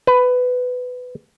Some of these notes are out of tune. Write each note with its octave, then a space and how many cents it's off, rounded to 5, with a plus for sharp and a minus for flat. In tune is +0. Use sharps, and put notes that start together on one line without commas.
B4 +15